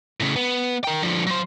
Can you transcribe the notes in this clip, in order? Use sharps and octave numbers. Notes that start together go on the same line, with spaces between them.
A2 C#3
B3
A#4 G5
D3 F3
F#3 C5